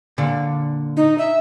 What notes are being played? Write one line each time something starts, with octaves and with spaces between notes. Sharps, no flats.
A#2 D3
D#4
E5